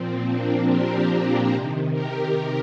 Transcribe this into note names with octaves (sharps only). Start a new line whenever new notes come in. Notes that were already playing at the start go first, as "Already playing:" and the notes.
Already playing: A#2 F3 C4
A#3 D4
G4 A#4
C3 D#3
G4 A#4